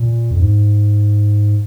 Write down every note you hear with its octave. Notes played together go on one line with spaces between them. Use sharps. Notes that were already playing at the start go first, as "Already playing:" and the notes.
Already playing: A#2
F2
G#2